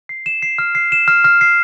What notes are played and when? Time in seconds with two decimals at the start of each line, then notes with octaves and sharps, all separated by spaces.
0.09 C7
0.26 E7
0.42 C7
0.58 F6
0.75 C7
0.92 E7
1.08 F6
1.24 F6
1.41 C7